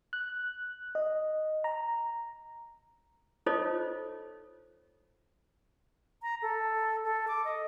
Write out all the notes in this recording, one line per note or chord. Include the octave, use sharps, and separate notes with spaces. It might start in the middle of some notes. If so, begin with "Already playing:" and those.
F#6
D#5
A#5
D#4 F4 A4 C5 C#5 D#5
A#5
A4
A4
D6
D#5